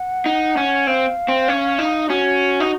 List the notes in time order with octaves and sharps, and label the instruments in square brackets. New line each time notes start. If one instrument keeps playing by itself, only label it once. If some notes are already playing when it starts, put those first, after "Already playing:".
Already playing: [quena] F#5
[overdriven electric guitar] D#4
C#4
[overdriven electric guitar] C4 [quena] F5
[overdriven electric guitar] C4
C#4
D#4
[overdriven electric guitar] C#4 [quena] F#4
[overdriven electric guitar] D#4